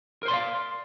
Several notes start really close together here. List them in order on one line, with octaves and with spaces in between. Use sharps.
A#4 C5 C6 D5 F5